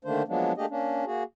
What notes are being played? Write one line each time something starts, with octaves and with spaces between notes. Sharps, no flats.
D3 D#3 A3 A#3 D4 C5
F3 F#3 G#3 A#3 B3 D4
A3 A#3 D4 G4 G#4 D#5
A#3 C#4 D4
A#3 F#4 G#4